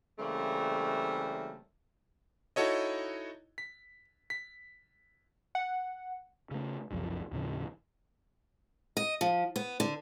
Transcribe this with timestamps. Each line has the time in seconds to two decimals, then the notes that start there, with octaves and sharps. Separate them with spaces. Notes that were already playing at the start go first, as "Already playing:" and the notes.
0.19 C#3 E3 G3 A3 A#3 C4
2.56 D#4 E4 F#4 A4 C#5 D#5
3.58 B6
4.30 B6
5.55 F#5
6.51 C#3 A3
6.91 F#1 C2 F#2 F3
7.32 D#2 A2 C#3 F3
8.97 D#5
9.21 F3
9.56 B3
9.80 D3